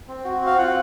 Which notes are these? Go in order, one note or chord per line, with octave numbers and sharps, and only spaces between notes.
C4
F#4
C4 F5
F4 F#5